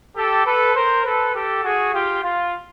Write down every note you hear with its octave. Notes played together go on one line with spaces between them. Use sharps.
G4 A4
A4 B4
A#4 C5
A4 B4
G4 A4
F#4 G#4
F4 G4
F4